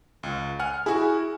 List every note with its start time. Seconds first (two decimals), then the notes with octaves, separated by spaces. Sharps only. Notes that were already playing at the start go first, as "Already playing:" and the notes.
0.23 C#2
0.59 F#5 G#5 F6
0.86 E4 F#4 G#4